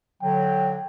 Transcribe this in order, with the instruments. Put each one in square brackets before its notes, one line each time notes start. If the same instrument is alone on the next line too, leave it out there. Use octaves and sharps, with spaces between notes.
[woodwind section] D3 F#3 [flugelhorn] G5